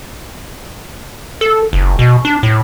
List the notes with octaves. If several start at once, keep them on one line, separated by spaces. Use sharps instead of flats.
A4
F#1
B2
D4
A2